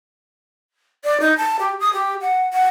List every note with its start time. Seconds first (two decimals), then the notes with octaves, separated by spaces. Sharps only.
1.04 D5
1.20 D#4
1.37 A5
1.59 G4
1.80 D#6
1.93 G4
2.21 F#5
2.53 F#5